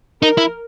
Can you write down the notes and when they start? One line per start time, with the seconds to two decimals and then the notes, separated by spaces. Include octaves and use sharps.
0.22 D#4 A#4
0.38 E4